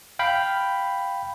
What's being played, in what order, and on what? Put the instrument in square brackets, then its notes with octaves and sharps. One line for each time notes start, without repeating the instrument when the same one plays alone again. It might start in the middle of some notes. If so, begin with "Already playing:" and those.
[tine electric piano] F5 G5 B5